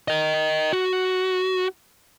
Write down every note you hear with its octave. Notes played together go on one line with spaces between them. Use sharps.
A#4 D#5
F#4